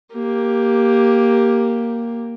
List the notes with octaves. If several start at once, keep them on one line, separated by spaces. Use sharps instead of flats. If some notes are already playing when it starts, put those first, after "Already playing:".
A#3 G4